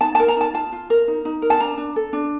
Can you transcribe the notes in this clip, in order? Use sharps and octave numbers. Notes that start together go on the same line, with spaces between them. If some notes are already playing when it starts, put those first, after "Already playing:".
D#4 A5
A5
A#4
A#5
D#4 A5
F4 A5
F4
A#4
D#4
D#4
A#4
A5
D4 A#5
D4
A4
D4